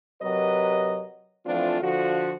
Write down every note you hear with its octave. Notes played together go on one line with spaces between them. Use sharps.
C3 F#3 A#4 B4 D#5
E3 F3 A3 C4 D4 F4
D3 F3 F#4